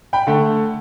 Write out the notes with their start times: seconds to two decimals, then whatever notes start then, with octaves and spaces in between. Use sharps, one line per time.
0.13 G5 B5
0.27 D3 A3